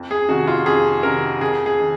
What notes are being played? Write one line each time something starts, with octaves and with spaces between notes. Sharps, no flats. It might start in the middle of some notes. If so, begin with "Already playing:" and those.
Already playing: F2
G#4
C3 D#3 F#4
F4
F2 G#4
C3 D#3 A#4
F2 G#4
G#4
D#3